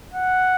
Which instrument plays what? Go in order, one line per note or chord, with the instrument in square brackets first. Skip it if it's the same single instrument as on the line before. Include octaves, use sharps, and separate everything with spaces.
[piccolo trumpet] F#5